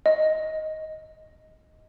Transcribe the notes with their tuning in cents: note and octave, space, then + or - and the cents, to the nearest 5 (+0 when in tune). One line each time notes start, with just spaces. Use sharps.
D#5 +10